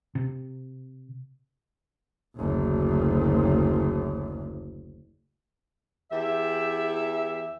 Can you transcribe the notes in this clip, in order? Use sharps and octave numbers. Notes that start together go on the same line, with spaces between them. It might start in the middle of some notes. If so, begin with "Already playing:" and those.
C3
F#1 D2
E2 G4 E5